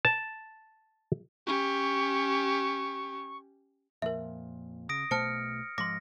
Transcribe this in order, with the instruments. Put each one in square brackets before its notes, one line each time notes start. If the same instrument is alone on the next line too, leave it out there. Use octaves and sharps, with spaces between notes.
[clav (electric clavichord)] A5
[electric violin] C#4 G4 [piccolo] C#6
[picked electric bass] F2 A#2 [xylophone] A#4 E5
[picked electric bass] C#3 [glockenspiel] D#6 A#6 D7
[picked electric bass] B1 B2 A3 [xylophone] C5 A5 [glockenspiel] F6 C#7
[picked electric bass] G#2 F3 [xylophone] C6 D6 [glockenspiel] A#6